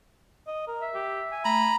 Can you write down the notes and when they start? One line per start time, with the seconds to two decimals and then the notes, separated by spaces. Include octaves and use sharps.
0.47 D#5
0.68 A#4
0.81 E5
0.95 G4
1.32 G#5
1.45 A3 A#5 B5